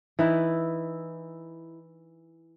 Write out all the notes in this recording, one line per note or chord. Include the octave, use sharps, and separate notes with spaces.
E3 D#4 E4